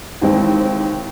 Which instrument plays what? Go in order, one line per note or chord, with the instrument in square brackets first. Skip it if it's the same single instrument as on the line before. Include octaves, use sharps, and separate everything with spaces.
[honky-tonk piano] D#2 E3 G#3 C4